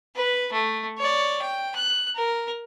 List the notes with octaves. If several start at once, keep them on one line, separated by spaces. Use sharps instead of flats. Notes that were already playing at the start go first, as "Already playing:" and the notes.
B4
A3
C#5 D5
G5
F#6
A#4